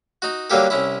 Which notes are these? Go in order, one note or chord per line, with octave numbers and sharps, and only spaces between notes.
D#4 F#4
D3 F#3 G3 A#3 G4 A4
C2 C#4 E4